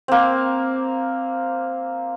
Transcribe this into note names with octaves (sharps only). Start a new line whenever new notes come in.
A#3 C4